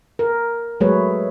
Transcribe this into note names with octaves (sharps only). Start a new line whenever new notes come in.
A#4
F#3 G#3 A3 G#4 B4 C#5